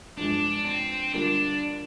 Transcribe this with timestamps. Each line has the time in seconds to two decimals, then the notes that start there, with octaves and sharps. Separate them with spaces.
0.17 G2 F3 G#3 D4
0.65 C4
1.14 D3 G3 A#3 D4 F4